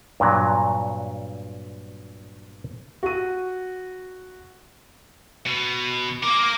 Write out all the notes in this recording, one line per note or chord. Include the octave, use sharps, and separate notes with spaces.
G2 A#2 F#3
F#4 D#7
B2
A#3 A#4 D6